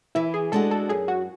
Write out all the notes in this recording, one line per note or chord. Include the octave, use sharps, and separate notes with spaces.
E3 E4
G#4
G#3 D4 F#4 A4
A4
F#2 G#4
F#4